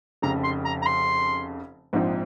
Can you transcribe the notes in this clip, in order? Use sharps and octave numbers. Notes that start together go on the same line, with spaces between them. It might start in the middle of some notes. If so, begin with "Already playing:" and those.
F1 F2 C#3 A#5
C6
A#5
A#5
C6
A#1 G#2 F3 C4 D#4